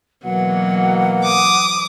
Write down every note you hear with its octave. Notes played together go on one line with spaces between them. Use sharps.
B2 E3 F#3 A#3 F#5
D6 D#6